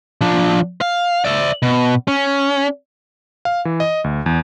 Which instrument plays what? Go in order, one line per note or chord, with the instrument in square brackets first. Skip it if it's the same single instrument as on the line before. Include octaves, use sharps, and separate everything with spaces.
[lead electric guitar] F3 D4
F5
D5 E5
B2
C#4
[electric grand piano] F5
E3
D#5
D2
E2